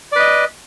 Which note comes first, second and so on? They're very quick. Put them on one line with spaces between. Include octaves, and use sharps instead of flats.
D5 B4 D#5